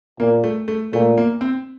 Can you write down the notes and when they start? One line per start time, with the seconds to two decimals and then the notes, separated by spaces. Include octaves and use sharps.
0.20 A#2 A#3
0.44 A3
0.68 A3
0.93 A#2 A3
1.18 A#3
1.41 C4